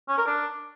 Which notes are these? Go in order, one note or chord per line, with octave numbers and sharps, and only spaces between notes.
C#4
A#4
D4